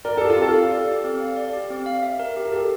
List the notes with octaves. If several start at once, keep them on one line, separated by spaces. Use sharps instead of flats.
A#4 D5
G4 A4
F4
C4 A4
F5
D5
G4
C4
F5
D5
G4
C4
F5
E5
A#4
G4
A#4
G4 A4